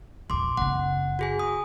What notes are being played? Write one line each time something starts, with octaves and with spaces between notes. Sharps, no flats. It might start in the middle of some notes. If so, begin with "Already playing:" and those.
A#1 E2 C6 D6
F#1 B3 F#5
F#4 G#4 G#5
D#6